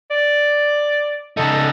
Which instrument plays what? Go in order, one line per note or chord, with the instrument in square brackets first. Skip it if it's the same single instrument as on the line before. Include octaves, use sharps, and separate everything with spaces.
[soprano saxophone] D5
[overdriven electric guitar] C#3 D#4 [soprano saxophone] A4